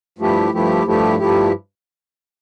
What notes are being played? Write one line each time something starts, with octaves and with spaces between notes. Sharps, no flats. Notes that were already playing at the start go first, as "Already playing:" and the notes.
G2 F3 A3 E4 G4
G2 F3 A3 E4 G4
G2 F3 A3 E4 G4
G2 F3 A3 E4 G4